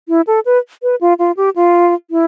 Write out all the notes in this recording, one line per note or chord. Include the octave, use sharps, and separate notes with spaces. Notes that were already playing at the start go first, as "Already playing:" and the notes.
E4
A4
B4
B4
F4
F4
G4
F4
E4